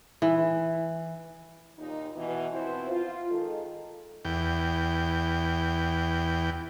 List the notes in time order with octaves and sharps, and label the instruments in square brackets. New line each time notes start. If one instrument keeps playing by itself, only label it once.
[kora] E3
[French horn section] D#2 A#2 D#4
B2 E3
B2 E3 F3 C4 E4 C5
F4
D#3 G#3 A4
[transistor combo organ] E2 G5